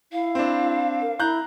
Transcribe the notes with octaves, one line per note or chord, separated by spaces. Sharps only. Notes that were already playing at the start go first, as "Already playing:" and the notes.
E4 F5
C4 D4
A#4
E4 A#5 F#6 G6